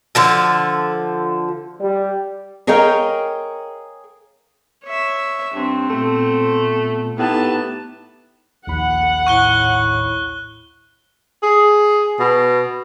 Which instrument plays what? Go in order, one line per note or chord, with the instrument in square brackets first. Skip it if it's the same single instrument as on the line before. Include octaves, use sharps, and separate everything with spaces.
[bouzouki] D3 F3 A4
[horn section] G3
[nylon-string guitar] G#4 A#4 C#5 D#5 F5 G5
[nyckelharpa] C#5 E5
[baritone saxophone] G2 [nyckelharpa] C4
[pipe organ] A#2 B3 [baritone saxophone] A3
[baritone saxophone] A2 [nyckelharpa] B3 A5 [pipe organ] D#4 G4
[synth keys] A#1 D#2 B5 [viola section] F#5
[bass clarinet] A2 [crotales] C#6 F#6 G7
[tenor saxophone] G#4
B2